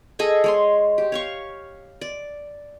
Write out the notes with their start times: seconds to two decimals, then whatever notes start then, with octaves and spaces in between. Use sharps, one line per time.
0.19 G#4 A4 D#5 G#5
0.44 G#3 C#5 C6
0.98 G4
1.12 C#5 F5 C#6
2.01 D5